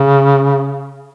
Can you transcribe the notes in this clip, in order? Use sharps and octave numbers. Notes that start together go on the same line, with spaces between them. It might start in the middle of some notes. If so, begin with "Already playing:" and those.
Already playing: C#3